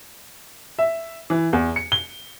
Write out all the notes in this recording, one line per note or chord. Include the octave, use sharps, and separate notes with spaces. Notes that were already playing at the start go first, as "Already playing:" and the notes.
E5
E3
E2
C#7
G7